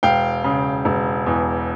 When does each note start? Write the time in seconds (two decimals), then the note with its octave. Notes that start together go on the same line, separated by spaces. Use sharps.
0.03 E1 F5 G5
0.44 C#3
0.85 E1
1.26 E2